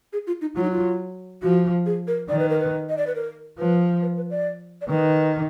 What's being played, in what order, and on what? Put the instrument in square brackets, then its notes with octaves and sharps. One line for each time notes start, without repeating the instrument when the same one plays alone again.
[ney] G#4
F4
D#4
[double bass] F#3 [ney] F4
[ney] D#4
F4
[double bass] F3 [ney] F#4
[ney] G#4
A#4
[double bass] D#3 [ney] D5
[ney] B4
A#4
B4
D#5
D5
B4
A#4
[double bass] F3 [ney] B4
[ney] B4
B4
D5
D5
[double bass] D#3 [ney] B4